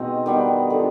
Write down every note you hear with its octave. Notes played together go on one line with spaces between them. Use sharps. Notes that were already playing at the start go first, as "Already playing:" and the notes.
Already playing: B2 G#3 C4 D#4
D#3 G3 B3
D3 F3 G#3